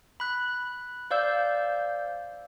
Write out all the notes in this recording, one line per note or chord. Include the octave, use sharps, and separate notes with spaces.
B5 F#6
C5 D5 F5 E6 G6